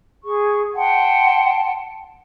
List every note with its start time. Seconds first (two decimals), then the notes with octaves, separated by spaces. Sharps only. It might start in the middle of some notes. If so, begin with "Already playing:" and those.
0.22 G#4 C#6
0.75 F#5 G5 A5 C6